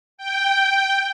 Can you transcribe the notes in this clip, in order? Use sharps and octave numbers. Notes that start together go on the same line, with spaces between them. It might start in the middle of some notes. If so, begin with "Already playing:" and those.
G5